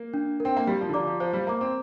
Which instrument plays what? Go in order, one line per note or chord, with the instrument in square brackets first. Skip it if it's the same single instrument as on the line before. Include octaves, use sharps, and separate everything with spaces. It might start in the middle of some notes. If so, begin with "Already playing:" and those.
Already playing: [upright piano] A#3
[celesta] D4
A#4
[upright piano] C4 [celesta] G5
[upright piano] A#3
[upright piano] G3 [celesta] G4
[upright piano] F3
D3
[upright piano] F3 [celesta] D5 A#5 D6
[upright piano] F3
[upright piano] F3 [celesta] C5
[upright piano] G3
[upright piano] A#3 [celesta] A#5 D6
[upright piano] C4